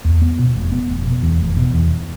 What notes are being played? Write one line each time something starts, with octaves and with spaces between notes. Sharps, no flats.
E2
B3
B2
F1
B3
F1
B2
E2
F1
B2
E2